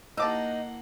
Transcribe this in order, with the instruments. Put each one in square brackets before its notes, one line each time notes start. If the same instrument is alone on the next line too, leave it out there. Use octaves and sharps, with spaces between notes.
[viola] A#3 F#5 [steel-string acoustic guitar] D#4 [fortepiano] A5 D6 E6